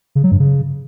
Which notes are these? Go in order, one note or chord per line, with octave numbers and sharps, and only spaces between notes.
C#3
F#3
G2
C#3